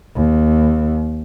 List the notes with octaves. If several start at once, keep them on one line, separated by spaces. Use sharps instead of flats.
D#2